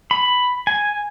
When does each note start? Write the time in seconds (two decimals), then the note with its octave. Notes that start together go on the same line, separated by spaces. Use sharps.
0.11 B5
0.67 G#5